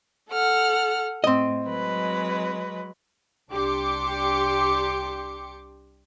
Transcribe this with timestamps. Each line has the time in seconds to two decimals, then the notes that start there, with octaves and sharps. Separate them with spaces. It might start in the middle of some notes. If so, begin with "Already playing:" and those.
0.31 A4 F#5 F6
1.24 A2 C4 D#5
1.66 F#3 G#3 B4
3.51 C2 D4 G4 C6 D6 C#7